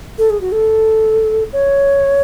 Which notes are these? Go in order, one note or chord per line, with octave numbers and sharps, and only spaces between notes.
A4
G#4
F#4
A4
C#5